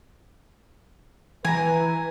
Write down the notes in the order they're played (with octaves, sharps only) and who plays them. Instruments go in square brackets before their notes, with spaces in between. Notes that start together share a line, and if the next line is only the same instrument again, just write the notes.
[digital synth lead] E3 [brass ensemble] B4 [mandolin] G#5 A#5